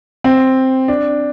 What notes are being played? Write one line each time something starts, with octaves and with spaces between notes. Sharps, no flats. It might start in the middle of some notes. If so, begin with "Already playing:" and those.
C4
D4